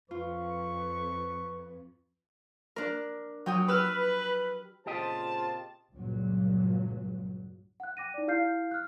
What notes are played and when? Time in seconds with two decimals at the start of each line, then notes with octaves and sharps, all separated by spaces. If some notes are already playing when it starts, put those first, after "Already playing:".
0.11 F2 F4 B4 C#6
2.76 D4 A#4
3.46 F#3 G5 D#6
3.68 G4 B4 E6 F6
4.87 A#2 C#3 C4 F4 G4 C5 D#5 A5
5.93 C#2 G2 A#2 F#3
7.80 F#5 F#6
7.97 G5 D6 A#6 D#7
8.14 D#4 D5
8.27 E4 G4 F5 F6 G6 C7
8.71 F6 F#6